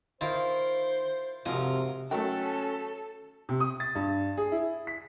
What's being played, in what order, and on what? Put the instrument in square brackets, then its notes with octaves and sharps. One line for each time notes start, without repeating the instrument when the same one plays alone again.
[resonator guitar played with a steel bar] D#3 F5 [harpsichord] E4 F4 A#4 [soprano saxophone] C5
[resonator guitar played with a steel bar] F2 G#2 F4 [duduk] C3 [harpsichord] F#4 A#4
[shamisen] D#3 G5 [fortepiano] F#3 A3 [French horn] C#4 [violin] A4
[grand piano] C3
D#6
A6
G2
G#4
E4
B6